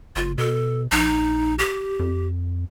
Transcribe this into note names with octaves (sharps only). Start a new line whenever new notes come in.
F#1 F4
B2 A4
A#1 D#4
G4
F2